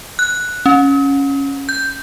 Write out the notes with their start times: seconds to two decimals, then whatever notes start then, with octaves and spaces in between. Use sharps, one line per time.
0.19 F#6
0.66 C#4
1.69 G6